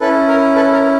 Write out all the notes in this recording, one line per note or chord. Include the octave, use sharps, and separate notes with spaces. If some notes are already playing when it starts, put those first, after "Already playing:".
C#4 E4 A4 B4
A#4
A4 B4
A#4